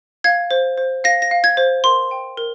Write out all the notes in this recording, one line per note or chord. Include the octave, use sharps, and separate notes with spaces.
F5 G#6
C5
C5
F5 A#6
A#6
F5
G#6
C5
A#4 C6
G5
A#4